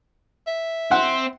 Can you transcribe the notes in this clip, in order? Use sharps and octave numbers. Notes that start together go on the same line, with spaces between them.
E5
C4 F#5